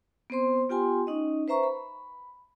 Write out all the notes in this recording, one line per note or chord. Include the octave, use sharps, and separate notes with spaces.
B3 C4 C5 C6
B3 F4 G4 G5 G#5 C6
C#4 D#4 D#5
B4 C5 E5 A#5 C#6
B5